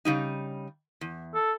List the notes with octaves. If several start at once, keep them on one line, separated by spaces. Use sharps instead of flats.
C#3 G3 D#4
E2
A4